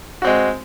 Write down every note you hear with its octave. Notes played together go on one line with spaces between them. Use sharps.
G#3 C4 F#4